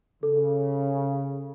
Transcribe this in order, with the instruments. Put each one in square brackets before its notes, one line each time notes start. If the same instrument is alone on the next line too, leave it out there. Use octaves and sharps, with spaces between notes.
[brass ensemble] C#3 [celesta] A4